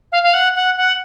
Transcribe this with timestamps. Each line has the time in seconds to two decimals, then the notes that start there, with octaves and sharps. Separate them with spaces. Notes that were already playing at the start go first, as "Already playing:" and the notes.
0.12 F5
0.23 F5
0.33 F#5
0.55 F#5
0.77 F#5